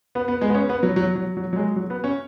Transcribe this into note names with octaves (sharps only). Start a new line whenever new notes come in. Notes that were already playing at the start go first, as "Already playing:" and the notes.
B3
B3
G#3
B3
C#4
B3
F#3
F#3
F#3
F#3
F#3
G#3
F#3
B3
C#4